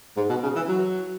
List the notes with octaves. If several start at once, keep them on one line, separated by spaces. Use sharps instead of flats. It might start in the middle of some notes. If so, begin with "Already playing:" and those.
G#2
B2
C#3
E3
F#3